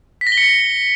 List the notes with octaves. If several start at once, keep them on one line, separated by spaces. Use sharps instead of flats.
B6
A#6
G7
C#7
A#6